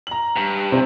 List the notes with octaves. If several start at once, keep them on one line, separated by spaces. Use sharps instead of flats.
A#5 F#7
G2
C3 C4